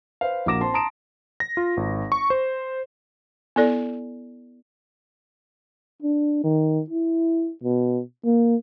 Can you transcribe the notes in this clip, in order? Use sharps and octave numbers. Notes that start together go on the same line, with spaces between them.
B4 C5 F5
A#1 A#3 F#4 D6 A#6 E7
C4 A5 C6
A5 A#5 C6 D#6 D7 E7
A#6
F4
G#1
C#6
C5
B3 E4 A4 D5
D4
D#3
E4
B2
A#3